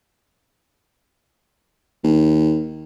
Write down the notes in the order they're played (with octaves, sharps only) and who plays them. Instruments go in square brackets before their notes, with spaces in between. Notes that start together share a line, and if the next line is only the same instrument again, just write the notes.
[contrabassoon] D#2